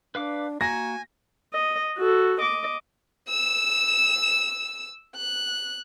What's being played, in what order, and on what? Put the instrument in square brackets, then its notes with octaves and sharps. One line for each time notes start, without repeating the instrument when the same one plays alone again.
[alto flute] D4 [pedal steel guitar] B4 F5 D6
[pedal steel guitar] A#3 F#4 [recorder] G#5 [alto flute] A#5 [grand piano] A#6
[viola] D#5
F#4 A4
D#5 D6
[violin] E6 E7
F#6